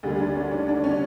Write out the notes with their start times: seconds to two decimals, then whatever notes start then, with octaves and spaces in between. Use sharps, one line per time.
0.03 D2 D3 G3 A#3
0.20 D4
0.36 C#4
0.51 D4
0.68 D4
0.84 C#4